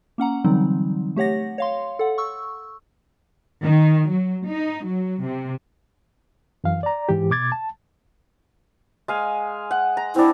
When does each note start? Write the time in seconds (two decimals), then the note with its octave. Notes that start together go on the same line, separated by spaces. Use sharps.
0.18 A#3 C#4 F#5 A#5
0.44 D3 E3 F#3 G3 C4 D#4
1.16 A3 G4 C#5 F#5 A#6
1.58 C#5 F5 C6
1.99 A4 F#5
2.18 C#6 E6
3.65 D#3
4.09 F#3
4.47 D#4
4.86 F#3
5.23 C3
6.64 F#2 E3 F5
6.83 D5 A#5
7.09 G#2 E3 G4
7.31 B2 D6 G#6 A6
7.52 A5
9.08 G#3 F5 G#5
9.71 F#5
9.97 A#5
10.16 C4 D4 E4